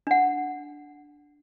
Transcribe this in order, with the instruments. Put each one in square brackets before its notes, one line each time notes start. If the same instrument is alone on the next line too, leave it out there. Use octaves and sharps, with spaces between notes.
[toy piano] D4 F#5